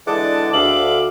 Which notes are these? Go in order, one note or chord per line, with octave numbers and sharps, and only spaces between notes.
D3 E3 G#3 D4 D#5 F#5 A5 D6
D2 E5 F5 D6 F#7